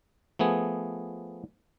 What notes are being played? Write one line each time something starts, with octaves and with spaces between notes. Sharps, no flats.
F3 A3 B3 G#4